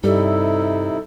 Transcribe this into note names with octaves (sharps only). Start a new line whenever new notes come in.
G2 C3 G3 D#4 E4 A4